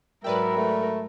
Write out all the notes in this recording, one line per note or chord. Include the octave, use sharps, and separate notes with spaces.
G#2 F#3 A#4 B4 D5 E5 G5 B5
A3